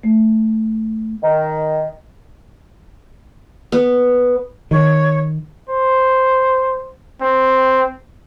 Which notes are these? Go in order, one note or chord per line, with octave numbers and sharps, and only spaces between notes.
A3
D#3
B3
D#3 C#5
C5
C4